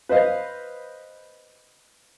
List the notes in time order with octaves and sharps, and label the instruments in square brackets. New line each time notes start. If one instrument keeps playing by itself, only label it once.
[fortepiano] B4 C5 D#5 F5